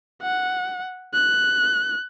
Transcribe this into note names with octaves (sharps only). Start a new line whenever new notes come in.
F#5
F#6